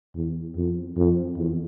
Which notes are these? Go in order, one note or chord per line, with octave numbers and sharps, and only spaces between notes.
E2
F2
F2
E2